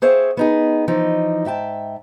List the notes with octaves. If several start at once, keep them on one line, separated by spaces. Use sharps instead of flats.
G#4 C5 C#5 E5 F5 G5
B3 D#4 G#4
E3 F3 D#4
G#2 E5 G5 A5